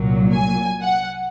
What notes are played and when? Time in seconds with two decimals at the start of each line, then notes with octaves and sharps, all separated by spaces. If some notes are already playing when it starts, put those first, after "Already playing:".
Already playing: C2 A#2 F#3
0.34 G#5
0.81 F#5